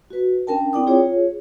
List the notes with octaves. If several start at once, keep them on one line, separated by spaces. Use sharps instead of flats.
F#4 B4
C#4 D4 A#4 G5 A5
C4 E4 D5 G5 D6 D#6
F4 G#4 C#5